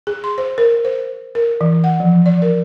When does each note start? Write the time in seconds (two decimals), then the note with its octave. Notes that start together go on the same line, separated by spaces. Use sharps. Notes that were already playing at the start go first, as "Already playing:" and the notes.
0.07 G#4
0.24 C6
0.38 C5
0.58 A#4
0.85 C5
1.35 A#4
1.61 E3
1.84 F#5
2.00 F3
2.26 D5
2.42 A#4